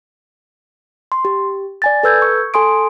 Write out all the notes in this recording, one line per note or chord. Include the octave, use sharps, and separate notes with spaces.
C6
G4
D5 G#5 A6
A4 B4 E6 G6 G#6
C#6
A4 G#5 C6 D#6 D7